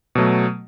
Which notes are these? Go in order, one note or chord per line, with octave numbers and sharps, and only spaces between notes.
B2 F#3 A3